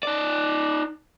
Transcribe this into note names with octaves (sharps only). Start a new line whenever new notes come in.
D#4 D5